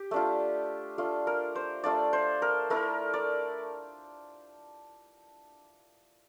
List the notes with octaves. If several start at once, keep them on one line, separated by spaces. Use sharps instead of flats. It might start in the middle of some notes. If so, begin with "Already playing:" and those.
Already playing: G4
A3 D4 F4
A3 D4 F4
A#4
C5
A3 D4 F4 D5
C5
A#4
A3 E4 A#4
D5